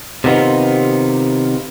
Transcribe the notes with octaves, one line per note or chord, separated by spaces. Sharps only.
C3 D#3 B3 D#4 F4